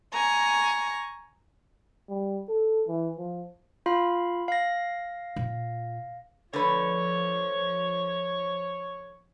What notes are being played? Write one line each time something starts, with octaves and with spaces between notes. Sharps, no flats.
G#5 A#5 C#6
G3
A4
E3
F3
F4 F5 B5
F5 A#6
A#2
D3 F3 A3 B4 C#5